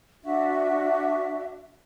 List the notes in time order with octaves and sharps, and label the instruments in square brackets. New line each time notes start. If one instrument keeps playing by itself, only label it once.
[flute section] D4 F#4 E5